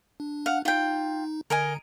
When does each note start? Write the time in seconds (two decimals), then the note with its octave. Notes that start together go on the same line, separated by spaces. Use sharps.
0.20 D4
0.46 F5 F#5
0.65 D#4 F4 G5
1.50 D3 A#4 D#5 G#5